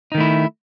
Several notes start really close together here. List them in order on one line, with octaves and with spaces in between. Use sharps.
D#4 D#3 A3 E4